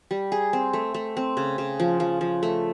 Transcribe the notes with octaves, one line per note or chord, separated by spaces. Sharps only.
G3
G#4
C4
A3
A3
C4
C#3
C#3
F3
F3
F3
A3